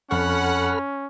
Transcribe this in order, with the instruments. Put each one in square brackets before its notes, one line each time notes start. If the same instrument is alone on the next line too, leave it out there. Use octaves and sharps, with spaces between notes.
[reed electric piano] F2 C#6 [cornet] C#4 [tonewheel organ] A4 B5 F6 [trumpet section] F#5